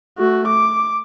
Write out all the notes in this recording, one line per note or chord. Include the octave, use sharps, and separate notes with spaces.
A3 F#4
D6